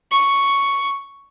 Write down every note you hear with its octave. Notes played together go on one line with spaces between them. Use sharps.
C#6